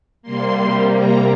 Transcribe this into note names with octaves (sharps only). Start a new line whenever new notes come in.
C3 G3 A#3 C6
A#5